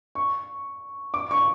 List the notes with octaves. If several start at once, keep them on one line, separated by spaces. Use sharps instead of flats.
C#6
D6
C#6